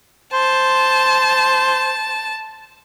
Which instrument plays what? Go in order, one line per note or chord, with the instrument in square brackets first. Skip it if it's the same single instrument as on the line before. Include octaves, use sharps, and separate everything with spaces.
[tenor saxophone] C5 [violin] A5